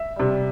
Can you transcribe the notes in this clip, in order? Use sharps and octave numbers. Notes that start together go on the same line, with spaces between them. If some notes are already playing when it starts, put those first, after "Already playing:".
Already playing: E5
C3 G3